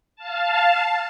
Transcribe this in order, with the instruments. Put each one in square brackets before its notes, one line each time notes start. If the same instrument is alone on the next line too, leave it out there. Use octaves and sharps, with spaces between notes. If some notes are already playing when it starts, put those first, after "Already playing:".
[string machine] F5 A5